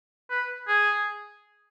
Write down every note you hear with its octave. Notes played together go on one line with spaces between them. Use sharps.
B4
G#4